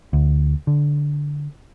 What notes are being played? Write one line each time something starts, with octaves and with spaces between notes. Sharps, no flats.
D2
D3